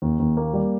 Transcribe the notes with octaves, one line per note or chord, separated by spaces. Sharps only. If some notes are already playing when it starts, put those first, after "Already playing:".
D#2
D#2
A#3
G3